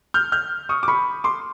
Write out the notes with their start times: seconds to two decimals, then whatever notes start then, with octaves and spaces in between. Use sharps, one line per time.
0.14 F6 G6
0.32 F6 G6
0.69 C#6 D#6
0.83 D6
0.88 B5 C#6
1.24 C6 D6